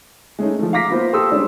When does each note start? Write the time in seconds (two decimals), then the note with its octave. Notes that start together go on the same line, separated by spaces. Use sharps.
0.39 G#3 A3 C#4 D#4
0.59 F3 A3
0.73 F5 A#5 D6 A#6 B6
0.89 A#3 B3 F4 C5
1.13 G4 A4 C6 D#6 E6
1.31 G3 G#3 C#4 D4